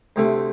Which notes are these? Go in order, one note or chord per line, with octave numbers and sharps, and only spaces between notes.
D2 C3 A3